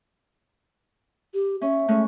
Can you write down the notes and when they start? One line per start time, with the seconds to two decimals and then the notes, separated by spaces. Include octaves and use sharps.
1.34 G4
1.62 C#4 E5
1.88 G#3 A3 C#4